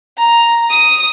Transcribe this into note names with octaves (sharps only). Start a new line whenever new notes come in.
A#5
D#6